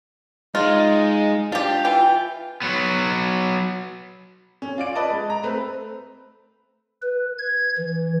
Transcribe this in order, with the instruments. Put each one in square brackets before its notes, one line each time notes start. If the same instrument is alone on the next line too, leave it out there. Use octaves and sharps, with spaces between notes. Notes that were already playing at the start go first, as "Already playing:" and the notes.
[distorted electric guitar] G#3 [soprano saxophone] D#4 [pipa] F4
[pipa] D4 G4 [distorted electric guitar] F4
[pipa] E3 [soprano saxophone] G5
[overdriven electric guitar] F#3 B3
[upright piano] C#4
F4 D5 D7
B4 D5 D#5 A5
G#3
A#5
A3 C4 B4
[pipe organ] B4
G#6
E3